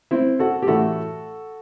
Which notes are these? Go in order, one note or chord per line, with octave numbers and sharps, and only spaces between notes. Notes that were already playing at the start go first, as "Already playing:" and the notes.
C4 E4
F#4 A4
G4
A2 E3 A3 F#4 A4